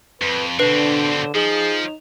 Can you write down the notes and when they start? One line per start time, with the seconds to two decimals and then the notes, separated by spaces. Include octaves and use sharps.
0.22 F2 B4
0.59 B2 D3 C4 D4 B4
1.35 F3 D#4 G#4